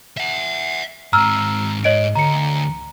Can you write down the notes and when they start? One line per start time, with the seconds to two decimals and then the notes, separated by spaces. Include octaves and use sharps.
0.17 E5 F#5
1.13 G#2 C4 A#5 E6 F6
1.84 G#2 C#5 D#5 D7
2.15 D2 A#5 C#7